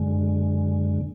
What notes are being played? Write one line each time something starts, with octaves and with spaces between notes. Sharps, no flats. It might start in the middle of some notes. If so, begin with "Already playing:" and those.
Already playing: F#2 D3 G#3